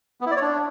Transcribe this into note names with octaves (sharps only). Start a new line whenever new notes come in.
B3
E4
D5
C#5
D4